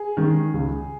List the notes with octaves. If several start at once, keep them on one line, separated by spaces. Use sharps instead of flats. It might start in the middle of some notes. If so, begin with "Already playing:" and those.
Already playing: G#4
D#3 G#3 C#4
C#2